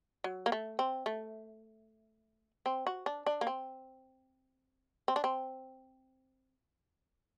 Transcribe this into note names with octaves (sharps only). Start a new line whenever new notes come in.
F#3
A#3
A3
C4
A3
C4
F#4
D4
D4
A#3
C4
C4
D4
C4